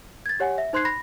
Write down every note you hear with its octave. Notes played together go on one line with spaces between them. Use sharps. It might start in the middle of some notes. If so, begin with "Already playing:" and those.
G#6 A6
G4 C#5 F#5 G#5
E5
D#4 C5 C6 F#6 G#6 C7
B5 A#6